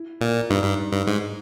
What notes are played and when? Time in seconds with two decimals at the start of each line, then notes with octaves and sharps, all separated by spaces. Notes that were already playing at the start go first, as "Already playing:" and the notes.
Already playing: E4
0.21 A#2
0.49 G2 D#4
0.64 G2
0.92 G2
1.07 G#2